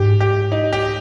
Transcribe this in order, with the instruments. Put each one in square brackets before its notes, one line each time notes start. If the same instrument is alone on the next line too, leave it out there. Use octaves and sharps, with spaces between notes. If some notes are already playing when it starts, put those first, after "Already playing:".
Already playing: [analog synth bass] G#2 [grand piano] G4
[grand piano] G4
D#4
G4